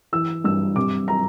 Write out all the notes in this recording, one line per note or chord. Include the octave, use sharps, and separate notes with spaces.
E3 E6
G2 E6
C3 D6
A#5